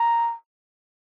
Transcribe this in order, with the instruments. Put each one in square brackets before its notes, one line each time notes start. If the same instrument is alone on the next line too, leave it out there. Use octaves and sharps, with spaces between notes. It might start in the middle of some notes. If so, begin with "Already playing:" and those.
Already playing: [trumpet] A#5